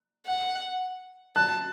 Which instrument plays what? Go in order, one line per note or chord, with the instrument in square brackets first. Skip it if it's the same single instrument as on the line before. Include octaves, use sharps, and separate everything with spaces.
[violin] F#5
[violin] A5 [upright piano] F#6